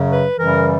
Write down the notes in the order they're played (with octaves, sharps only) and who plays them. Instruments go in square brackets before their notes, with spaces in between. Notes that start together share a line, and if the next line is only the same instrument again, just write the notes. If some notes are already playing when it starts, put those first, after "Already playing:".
Already playing: [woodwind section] F#2 C#3 F#3
B4
F#2 C#3 E3 G3 A#4